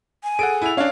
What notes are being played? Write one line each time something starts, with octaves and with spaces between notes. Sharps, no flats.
G#5
G#4 A4 F#5 D7
E4 F7
C#4 D4 C#5 F5